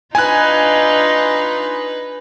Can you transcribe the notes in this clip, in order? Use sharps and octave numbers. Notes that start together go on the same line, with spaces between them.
D4 D#4 F4 B4 G#5 F#6